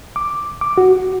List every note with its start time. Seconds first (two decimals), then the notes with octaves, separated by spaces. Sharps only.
0.16 D6
0.61 D6
0.78 F#4